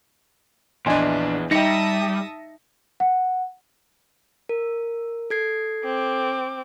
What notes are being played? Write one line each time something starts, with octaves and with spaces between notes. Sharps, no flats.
A#1 E2 D4 D#5 G#5 C6
G3 D#4 E5 G5 A5 D#6 A#6 C#7
F#5
A#4
A4 G#6 C7
C4 D6